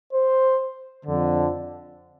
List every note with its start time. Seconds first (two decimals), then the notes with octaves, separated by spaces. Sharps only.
0.12 C5
1.05 F2 D3